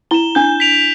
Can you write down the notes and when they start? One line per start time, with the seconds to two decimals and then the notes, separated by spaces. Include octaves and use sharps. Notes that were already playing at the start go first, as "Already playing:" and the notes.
0.11 E4 G7
0.14 E7
0.35 D4 G6
0.60 B6 D7 F7